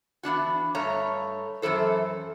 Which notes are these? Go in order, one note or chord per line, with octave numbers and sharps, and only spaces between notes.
E3 B3 D4 F#4
G2 A3 C#5 A#5
F#2 B2 E3 A4 C5